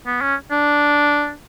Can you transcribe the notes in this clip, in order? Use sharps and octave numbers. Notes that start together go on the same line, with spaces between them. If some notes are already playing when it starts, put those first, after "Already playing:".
B3
C#4
D4